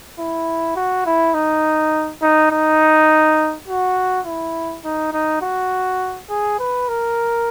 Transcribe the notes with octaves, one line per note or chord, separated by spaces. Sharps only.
E4
F#4
E4
D#4
D#4
D#4
F#4
E4
D#4
D#4
F#4
G#4
B4
A#4